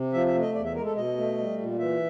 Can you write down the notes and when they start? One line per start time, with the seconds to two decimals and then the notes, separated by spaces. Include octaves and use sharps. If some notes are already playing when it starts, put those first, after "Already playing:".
Already playing: C3
0.13 F3 E5
0.27 E5
0.34 A3
0.41 D#5
0.55 E2 D5
0.65 E5
0.75 G#3 A#4
0.85 A4
0.96 B2 D#5
1.17 A3
1.38 G3
1.58 A#2
1.79 E3 E5